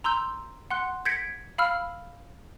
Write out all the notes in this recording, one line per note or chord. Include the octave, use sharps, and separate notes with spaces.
A#5 C6 E6 G6
F#5 C6 F#6
G6 G#6 A#6 B6 C#7 D7
F5 B5 E6 F6